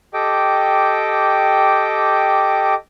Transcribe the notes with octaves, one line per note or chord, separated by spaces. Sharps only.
G4 A4 D#5 G5 D6